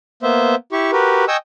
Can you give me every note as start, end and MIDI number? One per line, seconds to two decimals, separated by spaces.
0.23 0.55 58
0.23 0.55 59
0.23 0.55 72
0.23 0.55 76
0.72 0.91 64
0.72 0.91 67
0.72 0.91 85
0.92 1.25 66
0.92 1.25 67
0.92 1.25 70
0.92 1.25 71
1.28 1.37 75
1.28 1.37 79
1.28 1.37 80
1.28 1.37 85
1.28 1.37 87
1.28 1.37 88